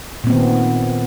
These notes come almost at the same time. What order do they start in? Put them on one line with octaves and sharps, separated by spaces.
A#2 C4 B3 D#3